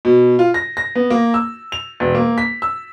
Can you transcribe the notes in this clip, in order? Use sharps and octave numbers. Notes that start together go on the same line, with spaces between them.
B2
F4
A#6
A#6
B3
A#3
E6
F7
E1
A#3
B6
E6